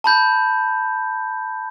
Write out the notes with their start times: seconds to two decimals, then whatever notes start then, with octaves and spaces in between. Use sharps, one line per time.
0.04 A5 B5 G6